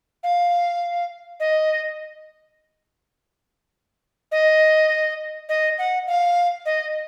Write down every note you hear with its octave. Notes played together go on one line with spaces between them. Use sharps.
F5
D#5
D#5
D#5
F#5
F5
D#5